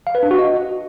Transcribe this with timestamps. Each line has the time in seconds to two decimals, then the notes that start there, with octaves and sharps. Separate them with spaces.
0.07 F5
0.15 B4
0.23 D4
0.31 F#4
0.39 D#5